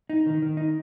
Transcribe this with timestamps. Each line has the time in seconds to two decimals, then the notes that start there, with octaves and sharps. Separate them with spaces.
0.10 D#4
0.27 D#3
0.42 D#3
0.57 D#4